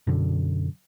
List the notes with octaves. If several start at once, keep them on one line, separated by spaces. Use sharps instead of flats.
F#2 B2 D3